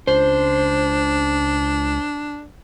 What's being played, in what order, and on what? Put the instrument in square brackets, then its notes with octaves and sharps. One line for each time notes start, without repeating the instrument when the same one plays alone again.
[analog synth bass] C#2 [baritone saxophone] D4 [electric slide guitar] C5